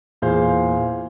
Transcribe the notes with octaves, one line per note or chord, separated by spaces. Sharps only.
E2 A#2 G#4 C5 F5 G6